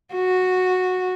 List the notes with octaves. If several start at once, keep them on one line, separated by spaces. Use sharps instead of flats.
F#4